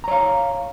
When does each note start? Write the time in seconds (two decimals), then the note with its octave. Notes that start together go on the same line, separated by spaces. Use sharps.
0.04 A#5
0.08 C#5
0.11 F5